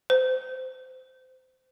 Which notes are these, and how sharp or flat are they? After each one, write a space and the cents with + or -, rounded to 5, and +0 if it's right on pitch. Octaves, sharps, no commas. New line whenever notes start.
C5 -25